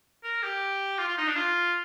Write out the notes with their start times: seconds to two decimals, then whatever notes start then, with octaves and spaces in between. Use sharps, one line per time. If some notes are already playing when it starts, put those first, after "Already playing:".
0.24 A#4
0.43 G4
0.99 F4
1.09 F4
1.18 D#4
1.28 D4
1.36 F4